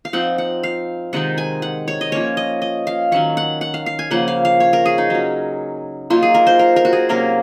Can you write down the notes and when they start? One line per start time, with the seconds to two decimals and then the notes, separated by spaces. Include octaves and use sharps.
0.05 F5
0.13 F3 C4 D#4 F#5
0.38 F#5
0.63 F5
1.13 C3 D#3 G#3 D#4 F#5
1.38 G#5
1.62 F#5
1.88 C#5
2.01 D#5
2.12 F3 A#3 C#4 C#5
2.37 D#5
2.62 D#5
2.87 F5
3.12 D#3 F#3 C#4 F#5
3.37 F#5
3.61 F#5
3.74 F5
3.86 F5
3.99 G#5
4.11 C#3 F3 A#3 C#4 F#5
4.28 F5
4.45 F5
4.60 C#5
4.73 A#4
4.85 G#4
4.98 D#4
5.10 F#3 C#4
6.10 F#3 A#3 D#4 F4
6.22 G#4
6.34 A#4
6.47 C5
6.59 A#4
6.76 A#4
6.85 F#4
6.93 G#4
7.09 C3 F#3 A#3 C#4 A#4